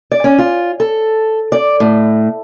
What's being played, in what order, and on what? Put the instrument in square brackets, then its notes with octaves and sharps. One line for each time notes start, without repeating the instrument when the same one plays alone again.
[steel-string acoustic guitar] D5
C#4
F4
A4
D5
A2